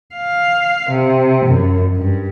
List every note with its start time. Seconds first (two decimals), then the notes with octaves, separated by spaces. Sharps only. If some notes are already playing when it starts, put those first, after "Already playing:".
0.16 F5
0.90 C3
1.46 F#2
1.96 G2